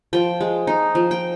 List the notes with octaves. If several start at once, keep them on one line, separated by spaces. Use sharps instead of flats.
F3 G5
G#3
D#4
F3
G5